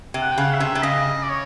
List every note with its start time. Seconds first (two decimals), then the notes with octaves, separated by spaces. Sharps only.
0.14 C3
0.21 F#5
0.32 G5
0.38 C#3 F#5
0.53 E5
0.60 C3
0.75 C3
0.83 C#3 D#5
1.23 D5
1.29 C#5